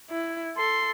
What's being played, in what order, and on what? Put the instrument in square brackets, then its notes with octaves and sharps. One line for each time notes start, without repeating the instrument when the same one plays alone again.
[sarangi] E4
[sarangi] A4 [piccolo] C6